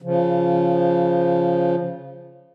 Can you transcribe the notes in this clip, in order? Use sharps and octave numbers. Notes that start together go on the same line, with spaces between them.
C#3 F3